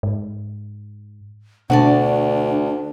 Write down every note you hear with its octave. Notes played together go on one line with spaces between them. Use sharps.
G#2
D2 B2 D4 F#4 D5 A5